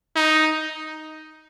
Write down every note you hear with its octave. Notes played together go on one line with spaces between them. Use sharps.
D#4